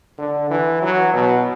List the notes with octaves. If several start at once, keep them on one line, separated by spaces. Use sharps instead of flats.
D3
E3
F#3
B2